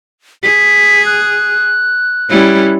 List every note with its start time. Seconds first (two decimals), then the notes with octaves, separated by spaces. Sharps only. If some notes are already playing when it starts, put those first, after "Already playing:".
0.43 G#4 B6
1.06 F#6
2.30 G3 C#4 E4